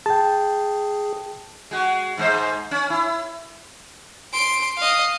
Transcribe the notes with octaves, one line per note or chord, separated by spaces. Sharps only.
G#4 G5 A5
G#3 F#4
G#2 G#3 C5
C#4
E4
C6 D7
D#5 F5